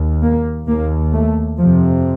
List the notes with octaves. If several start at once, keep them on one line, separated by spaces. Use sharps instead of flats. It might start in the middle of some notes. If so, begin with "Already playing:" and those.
Already playing: D#2
A#3
D#2 A#3
A3
F2 C3 F3